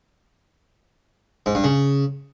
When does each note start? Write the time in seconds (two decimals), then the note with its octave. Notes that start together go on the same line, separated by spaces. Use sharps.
1.46 G#2
1.55 G2
1.64 C#3